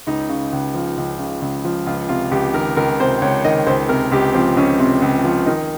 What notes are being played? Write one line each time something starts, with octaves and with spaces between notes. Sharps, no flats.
C#2 D#4
C#3
C#2
F3
C#2
C#3
C#2
F3
C#2 F4
C3 F4
C#2 G4
D#3 A#4
C#2 A#4
C3 C5
C#2 C#5
D#3 D#5
C#2 C5
C3 A#4
C#2 G4
F3 C4
C#2 C#4
C3
C#2
F3
D#3 D#4